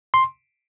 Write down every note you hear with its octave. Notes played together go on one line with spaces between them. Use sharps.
C6